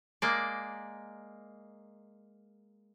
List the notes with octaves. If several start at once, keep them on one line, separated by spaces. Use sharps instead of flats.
G#3 A#3 D5